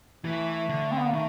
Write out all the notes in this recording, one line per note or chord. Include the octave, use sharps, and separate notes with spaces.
E3 A3
D3
C4
B3
A#3
D#3 A3